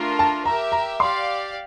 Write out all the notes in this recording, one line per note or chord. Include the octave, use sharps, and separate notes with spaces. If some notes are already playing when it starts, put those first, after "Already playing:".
Already playing: A3 D4 F4 A#4
A5
G4 A#4 E5 A#5
A#5
G4 D5 F5 C6